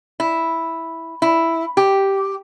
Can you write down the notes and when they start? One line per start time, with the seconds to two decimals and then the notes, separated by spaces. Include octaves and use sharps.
0.20 E4
1.22 E4
1.77 G4